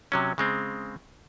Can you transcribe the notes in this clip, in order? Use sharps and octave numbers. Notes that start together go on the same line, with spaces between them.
C3 F#3 C#4
C#3 G#3 C4